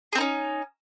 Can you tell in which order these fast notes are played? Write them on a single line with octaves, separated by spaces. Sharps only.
G#4 C4 D#4 C#4